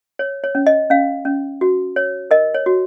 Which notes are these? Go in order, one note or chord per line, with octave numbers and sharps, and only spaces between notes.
C#5
C#5
C#4
D#5
C#4 F5
C#4
F#4
C#5
A#4 D#5
C#5
F#4